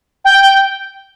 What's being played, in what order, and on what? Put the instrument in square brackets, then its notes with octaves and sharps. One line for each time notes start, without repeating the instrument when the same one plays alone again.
[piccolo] G5